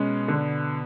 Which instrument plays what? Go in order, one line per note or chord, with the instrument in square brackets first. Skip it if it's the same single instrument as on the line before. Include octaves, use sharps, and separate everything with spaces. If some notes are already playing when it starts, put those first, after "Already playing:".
Already playing: [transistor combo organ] B2 [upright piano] G#3 C#4
[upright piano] D3